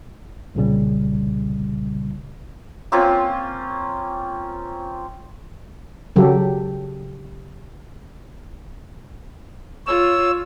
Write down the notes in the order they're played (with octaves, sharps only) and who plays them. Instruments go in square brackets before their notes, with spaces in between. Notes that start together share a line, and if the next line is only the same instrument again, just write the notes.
[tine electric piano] C2 A#2 C#3 G3
[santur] A#3 C4 C#4 F4
[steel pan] C#3 F#3 G4 A4
[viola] F4 [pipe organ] C#5 E6